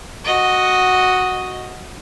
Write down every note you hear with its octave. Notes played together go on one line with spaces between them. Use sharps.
F#4 D#5